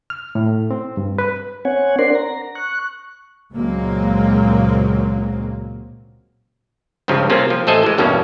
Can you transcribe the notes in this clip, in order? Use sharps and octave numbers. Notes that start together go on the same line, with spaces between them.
F6
A2
C4
G2
B4
C4 C#5 F#5 G#5
D4 A#4 C5 D5 F#5 C6
A#5
C#6 F#6
C#2 A#2 F#3 G#3 A#3 C4
C#2 G2 C#3 F3
C3 A#3 C4 C#4 F4
F3
A1 A3 A4 C5 D#5 G#5
E3 G#3
E2 G2 B2 A#3 C#4